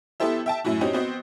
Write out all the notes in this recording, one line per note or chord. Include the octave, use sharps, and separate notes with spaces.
B3 E4 G4 A4 C5 E5
E5 G5 A5
F#2 A2 E4 F#4
C4 C#4 D#4 F#4 G4
B3 C4 F#4 D#5